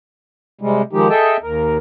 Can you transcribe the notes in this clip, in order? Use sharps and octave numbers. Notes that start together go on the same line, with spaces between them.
C3 G3 G#3
D#3 F3 G#3 D#4 G4
G#4 A4 D#5 E5 G5 A5
D#2 A#4